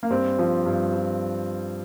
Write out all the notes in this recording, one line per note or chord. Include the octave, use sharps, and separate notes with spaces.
A#3
G2 C4
F3
G2
F3